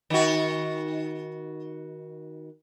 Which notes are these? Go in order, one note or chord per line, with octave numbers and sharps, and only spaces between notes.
D#3 F#4